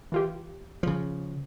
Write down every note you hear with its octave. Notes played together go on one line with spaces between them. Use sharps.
E3 F4 G4
C#3 F3